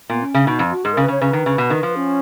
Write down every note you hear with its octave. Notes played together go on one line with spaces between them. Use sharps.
A#2 B3
C#4
C#3
B2 D#4
F2
F#4
G#2 G#4
C#3 A#4
B4
C#3 C#5
C#3 B4
D#3
C#3
B2
D#3
F3
C#4